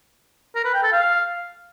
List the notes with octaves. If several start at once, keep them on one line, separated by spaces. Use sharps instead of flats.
A#4
B4
G5
A4
F5